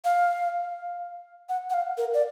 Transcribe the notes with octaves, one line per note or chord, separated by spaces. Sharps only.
F5
F#5
F#5
F5
A#4
D5